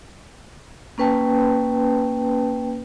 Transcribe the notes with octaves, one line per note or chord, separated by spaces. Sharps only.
A#3 C#4 B4 G5 A5